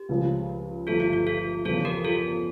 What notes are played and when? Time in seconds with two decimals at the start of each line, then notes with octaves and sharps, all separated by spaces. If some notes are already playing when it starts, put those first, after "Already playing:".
Already playing: G4
0.09 C#2 C#3 F3
0.87 G1 G2 F3 A3 F4 A4
1.00 F4
1.13 F4
1.27 F4 A4
1.65 E2 C#3 F3 F4 A4
1.85 G4 A#4
2.04 F4 A4